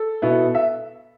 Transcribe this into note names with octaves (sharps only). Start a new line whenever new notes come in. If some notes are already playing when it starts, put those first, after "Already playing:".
Already playing: A4
B2 B3 E4
E5